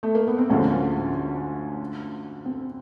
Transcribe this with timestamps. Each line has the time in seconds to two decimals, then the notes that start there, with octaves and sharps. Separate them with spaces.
0.03 A3
0.15 A#3
0.27 B3
0.38 C4
0.50 D2 D3 F3 G#3 C#4
2.45 C4